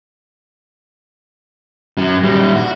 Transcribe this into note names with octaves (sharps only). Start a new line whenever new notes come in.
F#2 F#3
A#2 G3
F#4